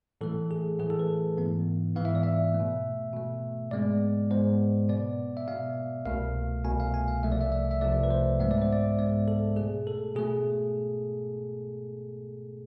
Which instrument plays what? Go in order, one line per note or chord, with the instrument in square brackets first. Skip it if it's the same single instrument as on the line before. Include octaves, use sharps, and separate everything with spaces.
[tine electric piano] A2 E3 A3 A4
G#4
A2 E3 A3 G#4
A4
B4
G#2 E3 B3
G#2 E3 B3 F5
E5
D5
E5
A3
B2
B2 A3
G#2 G#3 B3 D5
G#2 G#3 B3 C5
B2 B3 D5
E5
B2 B3 F5
C2 B2 A3 F5
C2 B2 A3 G#5
F5
G#5
F5
C2 C3 F3 A3 E5
D5
E5
E5
E5
C2 C3 F3 A3 D5
B4
C5
G#2 G#3 B3 E5
D5
C5
D5
G#2 G#3 B3 D5
A4
B2 A3 G#4
A4
B2 A3 G#4